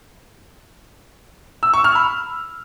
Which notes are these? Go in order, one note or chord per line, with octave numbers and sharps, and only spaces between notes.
E6
C#6
F6
B5